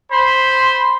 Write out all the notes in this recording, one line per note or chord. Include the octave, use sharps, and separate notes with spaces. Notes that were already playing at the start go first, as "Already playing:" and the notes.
C5 B5 C6